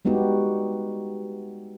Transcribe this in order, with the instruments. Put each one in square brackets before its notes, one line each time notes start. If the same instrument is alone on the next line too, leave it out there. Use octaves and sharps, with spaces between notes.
[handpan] G3 G#3 B3 D#4 F#4 G4